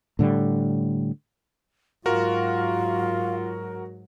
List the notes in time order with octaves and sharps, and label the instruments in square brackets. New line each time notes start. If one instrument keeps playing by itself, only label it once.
[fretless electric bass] A2 D3 G3
[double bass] G#2 F#3 [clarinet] F4 [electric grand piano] F#4 A#4 [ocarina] F5